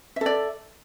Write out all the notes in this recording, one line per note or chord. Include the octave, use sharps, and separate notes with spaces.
A4 D5 E5